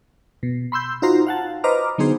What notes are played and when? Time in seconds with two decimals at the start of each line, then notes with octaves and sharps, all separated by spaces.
0.43 B2
0.72 B5 C6 E6 G6
1.02 D#4 F4 F#4 C5 A#5 C6
1.26 F5 F#5 A5
1.64 B4 C5 D#5 A#5 D6 F6
1.98 D3 F#3 B3 D#4 G#4 C5